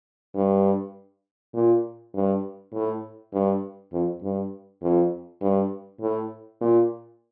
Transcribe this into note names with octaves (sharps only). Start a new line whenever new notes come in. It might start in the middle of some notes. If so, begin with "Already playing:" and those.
G2
A#2
G2
A2
G2
F2
G2
F2
G2
A2
A#2